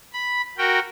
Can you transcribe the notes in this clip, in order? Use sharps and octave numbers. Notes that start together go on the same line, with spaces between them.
B5
F#4 A#4 G5